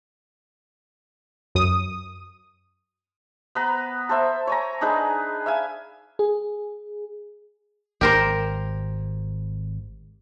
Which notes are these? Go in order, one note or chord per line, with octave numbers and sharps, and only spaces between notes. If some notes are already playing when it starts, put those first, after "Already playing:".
F#2 D#6
B3 B4 A#5
A4 C5 E5
C#5 G#5 A#5
D4 D#4 G#4 B4
E5 F5 G#5
G#4
G#1 G4 A#4 C5